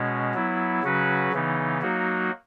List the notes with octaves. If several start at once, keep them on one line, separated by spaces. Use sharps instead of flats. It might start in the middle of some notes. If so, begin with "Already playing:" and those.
Already playing: B2 G#3 C#4
F#3 B3 E4
C#3 F#3 C#4 F#4 B4
C#3 E3 B3 D#4
F#3 A#3 D#4 F#4